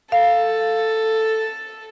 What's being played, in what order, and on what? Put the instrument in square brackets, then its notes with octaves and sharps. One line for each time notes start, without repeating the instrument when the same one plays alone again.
[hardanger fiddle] A4 [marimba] F5